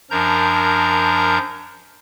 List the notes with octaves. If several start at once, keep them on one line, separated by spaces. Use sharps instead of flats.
F#2 F3 D4 A#4 A#5 G6